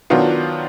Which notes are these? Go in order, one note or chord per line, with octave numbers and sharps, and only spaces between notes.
D#3 F#3 B3 D4 F4